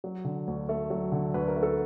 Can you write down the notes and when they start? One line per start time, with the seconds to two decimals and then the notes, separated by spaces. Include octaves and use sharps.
0.04 F#3
0.25 D3
0.47 D2
0.69 A3
0.90 F#3
1.12 D3
1.34 D2 B4
1.48 A#4
1.56 A3
1.63 A4